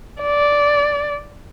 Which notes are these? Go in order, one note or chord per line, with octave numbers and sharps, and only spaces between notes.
D5